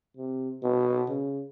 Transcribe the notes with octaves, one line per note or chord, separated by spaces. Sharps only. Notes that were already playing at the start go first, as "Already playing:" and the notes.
C3
B2
C#3